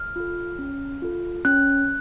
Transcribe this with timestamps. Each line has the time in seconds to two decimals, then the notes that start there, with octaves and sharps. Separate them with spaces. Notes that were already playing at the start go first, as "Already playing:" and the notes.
Already playing: F6
0.16 F4 A4
0.59 C#4
1.02 F4 A4
1.45 C#4 F#6